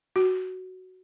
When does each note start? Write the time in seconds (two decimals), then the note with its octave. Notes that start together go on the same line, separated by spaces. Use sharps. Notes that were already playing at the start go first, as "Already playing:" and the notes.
0.16 F#4